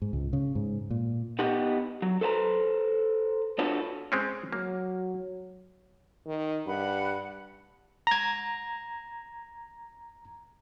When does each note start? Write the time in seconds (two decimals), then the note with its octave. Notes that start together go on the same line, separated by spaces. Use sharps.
0.02 G#2
0.13 C#2
0.33 C#3
0.55 G#2
0.90 A#2
1.39 B3 D#4 G4 F#5
2.02 F#3
2.21 A4 B4 C5 F#5 A#5
3.59 D4 F4 F#4 A4 B4 C#5
4.12 G#3 C4 C#4
4.52 F#3 A#3
6.27 D#3
6.67 G2 F#5 B5
8.07 A#5 G#6